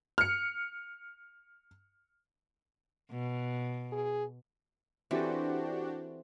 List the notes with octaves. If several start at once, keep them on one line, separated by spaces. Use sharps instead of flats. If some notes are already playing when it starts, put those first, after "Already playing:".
F6 C#7
B2
G#4
E3 C4 D4 F#4 G4 A4